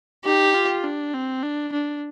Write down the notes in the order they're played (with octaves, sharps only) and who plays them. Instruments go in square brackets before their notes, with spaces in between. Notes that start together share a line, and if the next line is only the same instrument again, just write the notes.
[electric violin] D#4 [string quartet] G4
[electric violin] F4
D4
C4
D4
D4